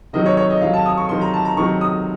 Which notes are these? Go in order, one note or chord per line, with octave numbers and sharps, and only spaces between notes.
C3 D#3 F#3 D#5
C#5
C#5
D#5
C3 D#3 F#3 F5
A5
D#6
C#6
C3 D#3 F#3 C6
A#5
A5
A#5
C3 D#3 F#3 C#6
D#6